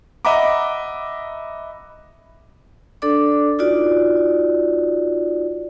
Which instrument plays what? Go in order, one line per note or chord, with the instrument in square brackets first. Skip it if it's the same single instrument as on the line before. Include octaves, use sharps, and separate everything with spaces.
[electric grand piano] D#5 E5 F#5 A#5 B5 D6
[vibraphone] D4 A4 D5 D6
D#4 F4 F#4 D5